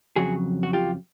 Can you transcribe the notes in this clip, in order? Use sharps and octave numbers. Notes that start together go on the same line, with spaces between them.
F2 C#3 F#3 F#4 G#4
F#4
F4 G4